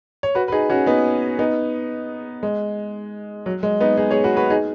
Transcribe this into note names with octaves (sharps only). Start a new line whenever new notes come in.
C#5
F#4 B4
B4
D#4 G#4
C#4 F#4
B3 D#4
B3 D#4
G#3
F#3
G#3
B3 D#4
D#4 G#4
G#4 C#5
F#4 B4
F#4 B4
D#4 G#4